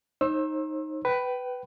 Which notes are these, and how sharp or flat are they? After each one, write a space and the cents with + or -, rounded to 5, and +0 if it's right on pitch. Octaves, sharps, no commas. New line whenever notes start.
D#4 +0 C5 +45 E6 +0
B4 +10 G5 -25